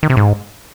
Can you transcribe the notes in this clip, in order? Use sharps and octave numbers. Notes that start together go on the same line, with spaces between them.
D#3
C3
G#2